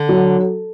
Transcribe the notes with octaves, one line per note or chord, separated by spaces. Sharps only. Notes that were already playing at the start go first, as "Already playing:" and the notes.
Already playing: D3
F#3